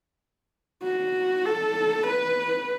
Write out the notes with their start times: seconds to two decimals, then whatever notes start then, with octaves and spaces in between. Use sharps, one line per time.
0.83 F#4
1.45 A4
2.07 B4